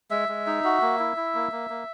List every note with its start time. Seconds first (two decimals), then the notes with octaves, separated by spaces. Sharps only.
0.11 G#3 E5
0.29 G#3
0.47 D#4
0.64 F#4
0.82 A#3
0.99 E4
1.17 E4
1.35 A#3
1.52 A#3
1.70 A#3